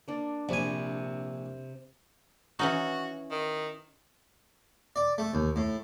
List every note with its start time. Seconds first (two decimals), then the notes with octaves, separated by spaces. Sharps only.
0.08 A#3 D4
0.49 A#1 C3 G#5 B5
2.59 E3 C#4 D#4 F#4
3.31 D#3
4.96 D5
5.18 A3
5.34 D#2
5.56 A2